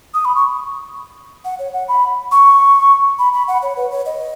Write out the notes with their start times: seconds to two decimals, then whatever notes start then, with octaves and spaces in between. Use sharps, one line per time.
0.14 D#6
0.25 B5
0.36 C#6
1.45 F#5
1.59 C#5
1.73 F#5
1.88 B5
2.32 C#6
3.19 B5
3.33 B5
3.48 F#5
3.62 C#5
3.76 B4
3.91 C#5
4.06 D#5